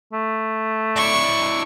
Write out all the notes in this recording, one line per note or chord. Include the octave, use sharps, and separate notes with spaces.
A3
D4 E4 C#6